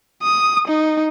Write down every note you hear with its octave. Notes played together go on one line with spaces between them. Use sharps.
D#6
D#4